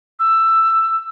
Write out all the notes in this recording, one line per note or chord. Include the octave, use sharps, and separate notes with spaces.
E6